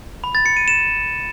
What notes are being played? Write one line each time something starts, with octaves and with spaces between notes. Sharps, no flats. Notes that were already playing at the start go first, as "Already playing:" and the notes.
B5
A6
C#7
D#7
E7